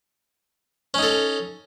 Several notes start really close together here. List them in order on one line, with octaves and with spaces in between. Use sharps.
C#4 D#4 A4